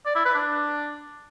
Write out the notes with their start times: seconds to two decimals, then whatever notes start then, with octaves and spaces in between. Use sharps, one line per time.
0.06 D5
0.15 E4
0.25 B4
0.35 D4